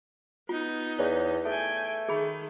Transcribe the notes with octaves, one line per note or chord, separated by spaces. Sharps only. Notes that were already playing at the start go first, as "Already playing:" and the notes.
B3 D#4 F4
E2 C#5 D5
A3 A4 G5 G#5
D#3 G#4 B5